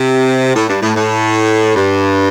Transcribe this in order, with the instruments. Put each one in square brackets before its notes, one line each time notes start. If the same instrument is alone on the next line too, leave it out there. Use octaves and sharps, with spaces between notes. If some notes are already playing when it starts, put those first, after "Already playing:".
Already playing: [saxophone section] C3
A2
G2
A2
A2
G2